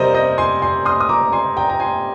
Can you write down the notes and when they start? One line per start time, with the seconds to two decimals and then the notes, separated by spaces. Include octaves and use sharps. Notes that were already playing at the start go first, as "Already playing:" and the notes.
Already playing: C3 G3 A#4 C5 D5 D#5
0.14 C5 D#5
0.38 G#5 C6
0.62 G#5 C6
0.85 C6 D#6
1.00 D#6
1.09 A#5 D6
1.32 G#5 C6
1.57 G5 A#5
1.69 A#5
1.80 G#5 C6